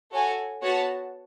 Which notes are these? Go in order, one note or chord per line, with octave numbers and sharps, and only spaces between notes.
F#4 A4 C#5 G#5
B3 F#4 C#5 F#5 A5